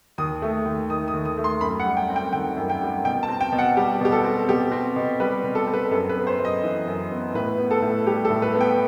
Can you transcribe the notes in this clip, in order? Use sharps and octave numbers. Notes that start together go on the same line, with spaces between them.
D#2 D#6
A3
D#2
D#3 D#6
D#6
D#2
D#6
A3
C6
F#2 B5
F#5
G3
G5
C4
G5
D#3 G5
F#2
G5
G3
B2 G5
A5
C4
G5
B2
F#5
G3 G4
B2 G4
A4
C4
B2 G4
C4
B2
G3 B4
B2
A4
C4
B4
F#2 A4
B4
B3
C5
F#2
D#5
E3
F#2
B3
A2 B4
B3
A4
A2
G3 G4
A4
A2
B4
B3
G5